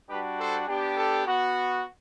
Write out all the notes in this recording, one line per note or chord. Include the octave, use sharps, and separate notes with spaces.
G3 D4 F#4 G4 B4
A4 C5
B3 D4 G4
A4
B3 F#4